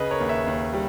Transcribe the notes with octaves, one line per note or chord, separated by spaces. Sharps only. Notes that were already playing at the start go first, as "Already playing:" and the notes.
Already playing: C#3 B4 D#5
A#4 C#5
D#2
C#5 E5
D#2
G3